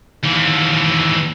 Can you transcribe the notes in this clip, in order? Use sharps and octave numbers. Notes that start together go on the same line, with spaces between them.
D#2 E3